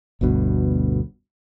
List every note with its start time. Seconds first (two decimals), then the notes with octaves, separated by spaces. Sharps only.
0.21 G1 D2 G2 B2